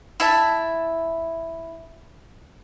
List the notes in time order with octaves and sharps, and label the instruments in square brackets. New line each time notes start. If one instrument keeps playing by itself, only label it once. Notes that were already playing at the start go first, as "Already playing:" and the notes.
[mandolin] E4 E5 A5